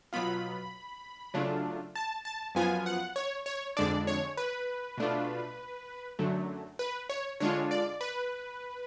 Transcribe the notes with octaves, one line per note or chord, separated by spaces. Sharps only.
B2 F#3 B3 F4 B5
C#3 F#3 A3 D4 F4
A5
A5
F#2 F3 B3 F4 G#5
F#5
C#5
C#5
F2 D3 G#3 D4 D5
C#5
B4
B2 A3 D4 F4
F#2 D3 F#3 A3
B4
C#5
D3 G#3 D4 F4 C#5
D5
B4